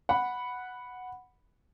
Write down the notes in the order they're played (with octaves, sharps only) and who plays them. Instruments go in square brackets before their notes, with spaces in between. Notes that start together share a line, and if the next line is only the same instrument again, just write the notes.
[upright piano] F#5 B5